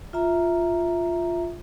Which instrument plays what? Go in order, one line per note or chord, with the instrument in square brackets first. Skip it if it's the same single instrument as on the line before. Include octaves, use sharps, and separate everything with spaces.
[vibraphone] F4 E5 A#5